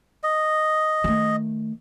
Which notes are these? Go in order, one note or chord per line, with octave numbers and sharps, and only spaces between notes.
D#5
D#3 A3